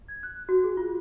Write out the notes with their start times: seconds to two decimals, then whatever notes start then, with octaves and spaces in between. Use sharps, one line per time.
0.08 G#6
0.23 F#6
0.49 F#4
0.64 G#4
0.77 F4